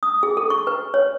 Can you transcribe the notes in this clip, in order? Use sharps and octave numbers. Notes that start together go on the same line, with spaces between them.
D#6
G#4
A4
C#6
B4
C#5